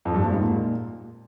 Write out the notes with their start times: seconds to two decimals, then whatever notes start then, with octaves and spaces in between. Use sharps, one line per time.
0.05 F2
0.14 G2
0.23 A#2
0.32 G#2
0.41 A#2